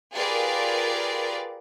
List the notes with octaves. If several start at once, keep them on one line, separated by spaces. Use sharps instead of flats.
F4 G4 G#4 A#4 B4 D5